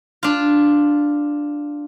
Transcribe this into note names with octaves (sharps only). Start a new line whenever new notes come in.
D4 F4